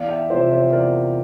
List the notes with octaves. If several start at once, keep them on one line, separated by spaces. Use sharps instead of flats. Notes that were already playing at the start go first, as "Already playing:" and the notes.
Already playing: E2 D5 F5
E5 G5
C3 F3 C5 E5
C5 E5
E2 A#4 D5